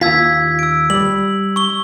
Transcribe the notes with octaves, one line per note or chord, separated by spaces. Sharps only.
D#2 F4 F5 E6 G#6 B6
E6 D7
G3 F#7
C#6 G7